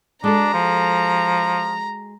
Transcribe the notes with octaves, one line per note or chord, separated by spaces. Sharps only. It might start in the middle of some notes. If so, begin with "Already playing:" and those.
G#3 D4 F#4 A4 A#5
F3